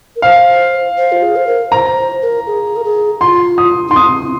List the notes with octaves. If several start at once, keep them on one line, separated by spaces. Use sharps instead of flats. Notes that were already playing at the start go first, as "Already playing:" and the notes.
A#4
C5 F5
C5
F4
G#4
C5
A#4
C5 A#5
C5
A#4
G#4
A#4
G#4
F4 C6
D#6
D#4 C6
C4 D#6
C4